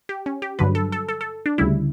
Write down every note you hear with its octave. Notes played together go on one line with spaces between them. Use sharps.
G4
C#4
G4
G2 D3 F#3 B4
A4
A4
A4
A4
D4
D2 C#3 G3 E4